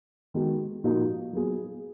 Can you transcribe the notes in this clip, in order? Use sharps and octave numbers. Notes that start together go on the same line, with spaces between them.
D#3 G#3 B3 D#4 F#4
A#2 F3 A#3 D#4 F#4
F#3 B3 F4 G#4